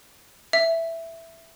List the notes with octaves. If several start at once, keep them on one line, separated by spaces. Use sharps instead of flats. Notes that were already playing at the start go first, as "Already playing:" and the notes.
E5